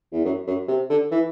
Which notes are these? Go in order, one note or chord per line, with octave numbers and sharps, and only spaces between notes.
E2
F#2
F#2
C3
D3
E3